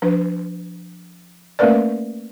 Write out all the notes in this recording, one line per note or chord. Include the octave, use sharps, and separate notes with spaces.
F3 D4 B4
A3 A#3 C#4 A#4 B4 D5